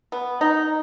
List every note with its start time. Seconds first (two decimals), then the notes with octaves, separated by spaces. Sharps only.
0.12 B3
0.41 D#4